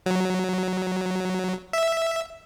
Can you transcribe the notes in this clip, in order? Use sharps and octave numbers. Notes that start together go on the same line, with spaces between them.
F#3
E5